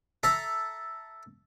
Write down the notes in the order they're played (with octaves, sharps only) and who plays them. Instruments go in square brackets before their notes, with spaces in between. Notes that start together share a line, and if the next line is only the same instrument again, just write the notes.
[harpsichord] A4 E5 A#5